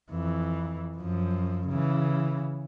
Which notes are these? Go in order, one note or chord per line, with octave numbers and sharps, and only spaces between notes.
F2 E3
F#2 F3
C#3 E3